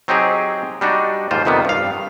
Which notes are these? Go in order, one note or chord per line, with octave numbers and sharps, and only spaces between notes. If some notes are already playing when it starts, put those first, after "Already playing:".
F#3 C4 D#4 G4 G#4
G3 D4 D#4 F#4
D#2 G#2 F4 C5
F2 C3 D#3 G3 B3
G2 F5